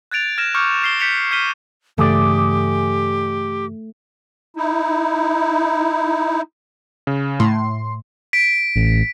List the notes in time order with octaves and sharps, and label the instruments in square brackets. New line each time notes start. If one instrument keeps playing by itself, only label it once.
[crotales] F#6 G#6 A6 D7 F7
F6 G#6 A#6 E7
C#6 D6 F6 G6 C#7
F6 C7 G7
G6 B6 C#7 D7 F7
F6 G6 B6 D#7 G7
[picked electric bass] G2 C#3 E3 [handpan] A3 [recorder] G4 [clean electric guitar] G#4 D5
[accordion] D#4 E4
[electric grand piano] C#3
[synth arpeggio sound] A2 [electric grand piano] C6
[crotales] B6 D7
[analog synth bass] A1